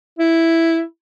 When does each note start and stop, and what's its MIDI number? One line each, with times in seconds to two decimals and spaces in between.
0.19 0.81 64